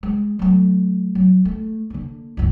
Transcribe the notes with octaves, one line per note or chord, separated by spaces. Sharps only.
G#3
F#3 A3
F#3
A3
D3 A#3
F#1 C#2